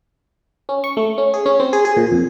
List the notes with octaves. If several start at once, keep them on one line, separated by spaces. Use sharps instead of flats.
C#4
C#6
A3
C#4
G#4
C#4
C4
G#4
G#4
A#2
F2